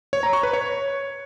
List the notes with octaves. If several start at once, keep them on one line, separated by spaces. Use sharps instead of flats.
C#5
A#5
C#6
B4
C#5